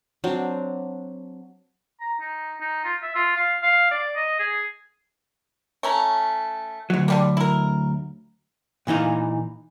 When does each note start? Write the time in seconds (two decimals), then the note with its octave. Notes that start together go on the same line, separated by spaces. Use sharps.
0.24 F#3 C4 D4
2.01 A#5
2.20 D#4
2.61 D#4
2.85 F4
3.02 E5
3.15 F4
3.36 F5
3.63 F5
3.91 D5
4.16 D#5
4.39 G#4
5.83 A3 C#4 A#5
6.90 D2 F#3
7.08 D3 G3 A#3
7.37 E4 A#4
8.87 A#2 E3 D#4 F5